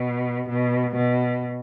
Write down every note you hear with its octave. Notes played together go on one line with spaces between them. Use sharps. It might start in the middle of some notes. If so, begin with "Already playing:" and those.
Already playing: B2
B2
B2